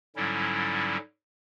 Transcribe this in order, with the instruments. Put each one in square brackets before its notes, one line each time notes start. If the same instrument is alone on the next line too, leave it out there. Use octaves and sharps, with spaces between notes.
[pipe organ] G#2 D3 F#3 G3 C#4 E4